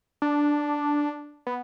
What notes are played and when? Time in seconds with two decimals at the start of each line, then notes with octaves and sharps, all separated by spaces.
0.22 D4
1.47 B3